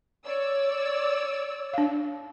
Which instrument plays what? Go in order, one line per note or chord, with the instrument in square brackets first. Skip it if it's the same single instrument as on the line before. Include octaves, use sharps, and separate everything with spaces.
[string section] C#5 D5 E6
[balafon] D4 F5